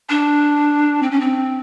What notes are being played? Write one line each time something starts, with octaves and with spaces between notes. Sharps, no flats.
D4
C4
C#4
C4